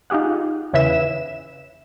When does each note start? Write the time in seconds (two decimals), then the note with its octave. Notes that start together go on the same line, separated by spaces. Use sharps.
0.10 D#4 F4 G4 G#4 F#5
0.73 E2 C#3 E4 B4 E5 E7